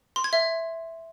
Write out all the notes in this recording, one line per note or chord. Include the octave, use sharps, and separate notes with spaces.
C6
G#6
E5